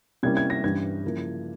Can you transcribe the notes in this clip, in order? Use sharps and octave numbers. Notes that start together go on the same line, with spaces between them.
C3 G3 A#3 C#4 E4 G#6
G#6
A#6
G2 E3 G3 C#4 G#6
C#3 F3 A#3 E4